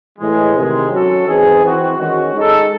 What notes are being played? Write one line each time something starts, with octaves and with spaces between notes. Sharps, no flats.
A2 E3 G#3
C3 D#3 G#3
F#3 C#4 F#4 A4
E3 C4 D#4 G#4
E3 C4 F#4
D#3 G#3 C#4 F#4
G#3 D#4 A4